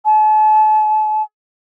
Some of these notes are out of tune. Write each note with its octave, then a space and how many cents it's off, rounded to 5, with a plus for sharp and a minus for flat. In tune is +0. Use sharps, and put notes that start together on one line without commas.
A5 -40